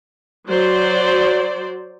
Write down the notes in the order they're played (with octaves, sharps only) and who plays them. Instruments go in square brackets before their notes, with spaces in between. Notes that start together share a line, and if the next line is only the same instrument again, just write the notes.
[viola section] F#3 C5 D5